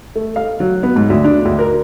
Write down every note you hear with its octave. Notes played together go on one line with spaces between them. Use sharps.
A3
F5
F#3
B3
G#2
D2
D4
D2
A#4